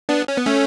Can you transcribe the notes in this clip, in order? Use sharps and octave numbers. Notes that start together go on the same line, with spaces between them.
B3 D4
C#4
B3
A3 C#4